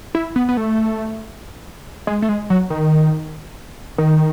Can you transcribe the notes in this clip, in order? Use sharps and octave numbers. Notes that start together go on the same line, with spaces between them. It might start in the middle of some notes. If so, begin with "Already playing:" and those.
E4
B3
B3
A3
G#3
A3
G#3
F#3
D#3
D#3